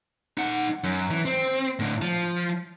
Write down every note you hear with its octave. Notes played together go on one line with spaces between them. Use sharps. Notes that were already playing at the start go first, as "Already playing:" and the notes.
D#4 F#5
F#2
E3
C4
A2 D3
F3